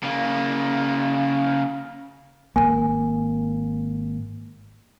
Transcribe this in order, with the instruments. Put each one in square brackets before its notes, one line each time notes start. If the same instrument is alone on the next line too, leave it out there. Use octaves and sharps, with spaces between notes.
[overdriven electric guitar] C#3 A#3
[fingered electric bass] G#1 F2 A#3 [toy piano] G#5